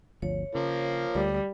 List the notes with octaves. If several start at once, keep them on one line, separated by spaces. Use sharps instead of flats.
G1 D2 F3 C#5
C#3 F3 A#3
D2 G3